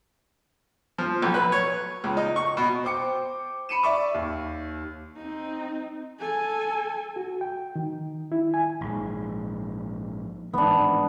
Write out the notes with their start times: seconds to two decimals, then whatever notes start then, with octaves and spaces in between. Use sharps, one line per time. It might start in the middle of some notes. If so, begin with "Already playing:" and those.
0.98 F3
1.22 B1
1.34 B4
1.52 C#5
2.04 C#2
2.17 D#4
2.36 C#6
2.57 B2
2.84 C5 G5 D6 C#7
3.69 B5 C#7 D#7 E7
3.83 D5 E5 C#6 D6
4.14 D#2
5.16 C4 D#4
6.20 A4 G#5
7.16 F#4
7.41 G5
7.75 D#3
8.32 E4
8.54 G#5
8.81 A#1 G#2
10.53 A1 G#2 D#3 B3 D4